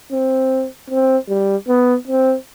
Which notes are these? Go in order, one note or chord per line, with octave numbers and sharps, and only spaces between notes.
C4
C4
G3
B3
C4